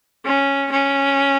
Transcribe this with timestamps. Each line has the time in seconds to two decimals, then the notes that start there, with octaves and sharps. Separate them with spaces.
0.25 C#4
0.72 C#4